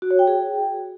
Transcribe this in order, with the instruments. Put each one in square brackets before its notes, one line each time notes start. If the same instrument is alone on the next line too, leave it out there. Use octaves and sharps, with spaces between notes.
[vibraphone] F#4
C#5
G5
G#4